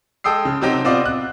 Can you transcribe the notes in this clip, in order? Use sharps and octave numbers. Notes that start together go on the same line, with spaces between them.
G#3 A4 G5 D#6 E6 C7
C#3
C3 F#3 C4 D#4 G4
B3 C4 F4 D5 D#5
F#6